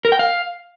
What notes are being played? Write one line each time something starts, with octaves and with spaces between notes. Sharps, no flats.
A#4
G5
F5